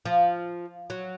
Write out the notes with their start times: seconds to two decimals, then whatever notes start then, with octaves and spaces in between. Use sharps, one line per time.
0.05 F3
0.90 F#3